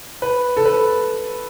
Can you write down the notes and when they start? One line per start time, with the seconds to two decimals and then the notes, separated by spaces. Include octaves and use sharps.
0.22 B4
0.57 A4
0.65 B4